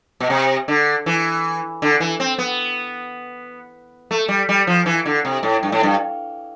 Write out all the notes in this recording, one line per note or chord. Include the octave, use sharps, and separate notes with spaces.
B2
C3
D3
E3
D3
E3
C4
B3
A3
G3
G3
F3
E3
D3
C3
A2
G2
A2
G2